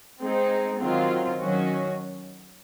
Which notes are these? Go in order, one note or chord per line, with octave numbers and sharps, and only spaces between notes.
G#3 C4 D#4
D#3 F#3 C4 F4
D#3 F#3 C#4 F#4